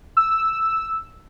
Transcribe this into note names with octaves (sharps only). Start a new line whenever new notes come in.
E6